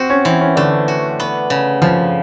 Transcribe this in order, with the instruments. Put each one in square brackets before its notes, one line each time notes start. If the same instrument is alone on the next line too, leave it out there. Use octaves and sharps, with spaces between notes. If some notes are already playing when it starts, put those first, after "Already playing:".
Already playing: [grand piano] C4 [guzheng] F#4
[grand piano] C#4
[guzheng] E3 [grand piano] C4
[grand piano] C#4
[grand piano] D3 D4 [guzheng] A3
[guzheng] F#4
B3
C#3
[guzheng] C#3 [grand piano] F3 F4